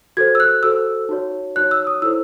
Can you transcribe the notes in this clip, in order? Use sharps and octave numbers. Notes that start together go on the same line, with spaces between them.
F#4 A4 C5 G#6
E6
F#6
F#4 A4 C5 E6
D#4 F#4 C#5
D#4 F#4 C#5 F#6
E6
D#6
E4 A4 C5 E6